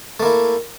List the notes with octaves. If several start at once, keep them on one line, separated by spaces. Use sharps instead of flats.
A3 A#3 E4